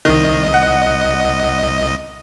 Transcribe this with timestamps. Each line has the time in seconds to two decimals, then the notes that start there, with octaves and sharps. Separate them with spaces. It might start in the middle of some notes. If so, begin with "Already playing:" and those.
0.05 C2 D#3 D#5
0.54 F#5